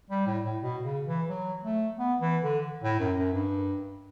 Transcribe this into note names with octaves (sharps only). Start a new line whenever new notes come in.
G3
A2
A2
B2
C#3
E3
F#3
A3
B3
E3
D3
A2
F#2
F#2
G2